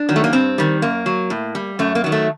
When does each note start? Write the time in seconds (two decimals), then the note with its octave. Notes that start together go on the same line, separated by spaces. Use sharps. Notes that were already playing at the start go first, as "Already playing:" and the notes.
Already playing: D4
0.09 D#3 F#3
0.16 A3
0.24 A#3
0.33 G2 C4
0.58 D#3 G3
0.82 F#2 A#3
1.06 F#3
1.30 A2
1.55 G3
1.79 F#2 A3
1.95 A#3
2.04 D#3 F#3
2.12 A3